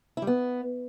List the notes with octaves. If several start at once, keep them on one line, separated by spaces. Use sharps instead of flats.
E4
G3
B3